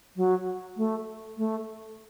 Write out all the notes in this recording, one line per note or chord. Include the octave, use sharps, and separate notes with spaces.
F#3
A3
A3